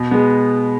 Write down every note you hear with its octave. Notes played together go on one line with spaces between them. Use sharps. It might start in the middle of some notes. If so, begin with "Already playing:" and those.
Already playing: B2
G#3 B3